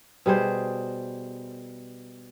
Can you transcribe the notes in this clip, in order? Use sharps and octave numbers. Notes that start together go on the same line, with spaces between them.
B2 G3 G#4 C5